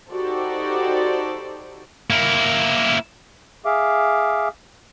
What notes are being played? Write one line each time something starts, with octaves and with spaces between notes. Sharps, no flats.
D#4 F#4 G4 A4 C5 D5
A#3 E4
G#4 E5 F5 D6